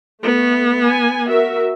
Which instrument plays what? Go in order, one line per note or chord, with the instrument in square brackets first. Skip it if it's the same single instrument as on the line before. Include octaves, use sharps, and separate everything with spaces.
[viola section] A3 [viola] B3
[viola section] G#5
F#4 A#4 E5